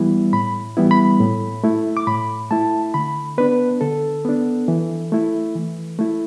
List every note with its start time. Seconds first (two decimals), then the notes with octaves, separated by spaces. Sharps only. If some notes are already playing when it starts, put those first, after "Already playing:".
Already playing: E3 G3 B3 E4
0.33 A2 B5
0.77 E3 G3 B3 E4
0.91 B5
1.20 A2
1.64 A3 E4
1.97 D6
2.07 A2 B5
2.51 A3 E4 A5
2.94 D3 B5
3.38 B3 D4 B4
3.81 D3 A4
4.25 B3 D4
4.68 E3
5.12 A3 E4
5.56 E3
5.99 A3 E4